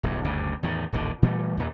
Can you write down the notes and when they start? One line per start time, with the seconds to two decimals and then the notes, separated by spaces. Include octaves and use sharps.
0.03 D1 B1 G2
0.24 F#1 D2 G2 C#3
0.63 E2 A2 D#3
0.92 D#1 A1 D#2 D3
1.22 A#2 E3 G3 A3
1.57 D#2 A#2